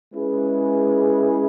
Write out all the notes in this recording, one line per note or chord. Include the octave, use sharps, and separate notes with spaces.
G#3 C#4 E4 G#4 B4